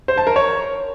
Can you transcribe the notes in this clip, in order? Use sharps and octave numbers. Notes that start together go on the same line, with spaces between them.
C5
A5
A#4
C#5